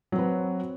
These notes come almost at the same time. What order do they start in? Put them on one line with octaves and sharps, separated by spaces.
F#3 C4 B4